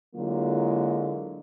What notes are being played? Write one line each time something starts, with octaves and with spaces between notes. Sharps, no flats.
D3 F#3 G#3 A#3 E4 F4